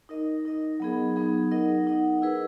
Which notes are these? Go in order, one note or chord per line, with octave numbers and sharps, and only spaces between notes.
D#4 A#4 D#5
D#4 A#4 D#5
F#3 B3 D#4 G#4
F#3 B3 D#4 G#4
D#4 A#4 D#5 F#5
D#4 A#4 D#5 F#5
E4 G#4 B4